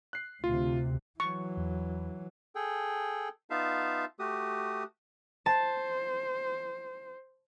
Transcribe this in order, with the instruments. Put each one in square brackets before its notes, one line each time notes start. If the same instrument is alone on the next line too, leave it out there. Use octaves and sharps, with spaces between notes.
[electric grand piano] F#6 C7
[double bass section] D2 C3 [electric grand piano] F4
[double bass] E3 F#3 [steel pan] C#6
[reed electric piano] E2
[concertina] G#4 A4 G5
B3 D#4 F4 E5 F5 A5
A3 F#4 G4 D#6
[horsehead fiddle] C5 [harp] A5